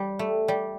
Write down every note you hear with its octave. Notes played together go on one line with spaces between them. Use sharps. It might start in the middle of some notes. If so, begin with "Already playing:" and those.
Already playing: G3
A3
G3